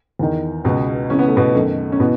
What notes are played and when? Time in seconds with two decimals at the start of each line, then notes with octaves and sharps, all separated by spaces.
0.19 E2 D#3
0.64 C#2 B2 B3
1.10 C#2 C#3 E3 C#4
1.19 B3
1.28 A3
1.36 B2 B3
1.54 F#2 D#3 A3
1.92 C#4
2.00 B2 E3 B3